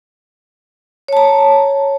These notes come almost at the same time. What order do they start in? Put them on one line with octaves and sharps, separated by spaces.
C#5 A5 A#5